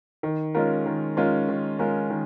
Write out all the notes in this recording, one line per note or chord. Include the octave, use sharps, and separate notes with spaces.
D#3
G#3 C#4 F4 A#4
D#3
G#3 C#4 F4 A#4
D#3
G#3 C#4 F4 A#4
D#3